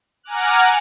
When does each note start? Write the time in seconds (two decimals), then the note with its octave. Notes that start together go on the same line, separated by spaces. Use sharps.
0.23 F#5 G#5 A#5 D6 F6 F#6